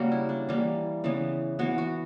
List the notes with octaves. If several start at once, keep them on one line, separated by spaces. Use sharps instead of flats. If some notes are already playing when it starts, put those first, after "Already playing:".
Already playing: C#3 G3 A#3 F#4
E4
D4
E3 G3 A#3
C#3 E3 B3
E3 B3 F#4
F#4